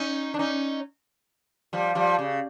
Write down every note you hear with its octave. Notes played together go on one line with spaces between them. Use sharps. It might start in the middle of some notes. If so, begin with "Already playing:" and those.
Already playing: C#4 D#4
D4
C#4 D#4
F3 G3
F3 G3
C#3